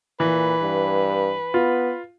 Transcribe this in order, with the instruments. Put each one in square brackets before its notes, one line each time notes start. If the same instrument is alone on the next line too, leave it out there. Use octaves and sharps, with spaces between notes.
[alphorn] A#2 [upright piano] E3 [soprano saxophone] B4
[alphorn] G2
[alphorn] B3 [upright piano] F4